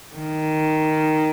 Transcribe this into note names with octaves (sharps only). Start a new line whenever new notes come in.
D#3